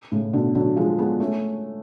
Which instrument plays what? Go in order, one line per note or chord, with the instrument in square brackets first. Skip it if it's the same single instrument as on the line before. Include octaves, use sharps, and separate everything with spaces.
[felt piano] A2 C#3
B2 D3
D3 F#3
F3 G#3
G#3 B3
A3 C#4